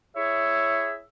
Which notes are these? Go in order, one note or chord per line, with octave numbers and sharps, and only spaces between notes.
E4 G#4 C#5 E5